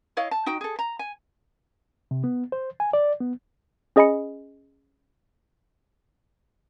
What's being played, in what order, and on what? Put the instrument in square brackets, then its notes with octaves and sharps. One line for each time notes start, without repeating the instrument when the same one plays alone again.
[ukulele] E4 C#5 D#5 F5
A5
D#4 F#4 G5
G#4 A4
A#5
G#5
[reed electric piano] C3
B3
C5
G#5
D5
B3
[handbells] C#4 G#4 D#5 G#5 B5 C#7